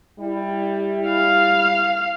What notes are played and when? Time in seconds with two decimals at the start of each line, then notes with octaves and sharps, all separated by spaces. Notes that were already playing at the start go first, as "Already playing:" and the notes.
0.19 G3 E4
1.08 F5